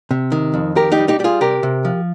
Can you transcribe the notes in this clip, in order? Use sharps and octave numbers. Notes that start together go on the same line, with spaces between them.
C3
D#3
F2
D#3 G4 A#4
D#4 G4
G3
D#4 G4
G3 G4
F4 G#4
C3 G4 A#4
C3
F3